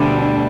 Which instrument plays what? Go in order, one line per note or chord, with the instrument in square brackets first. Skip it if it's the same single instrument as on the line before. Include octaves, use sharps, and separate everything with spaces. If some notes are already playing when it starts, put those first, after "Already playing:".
Already playing: [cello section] D2 D3 [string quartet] B2 G3 D4